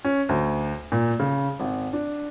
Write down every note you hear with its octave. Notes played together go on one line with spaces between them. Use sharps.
C#4
D2
A#2
C#3
G#1
D4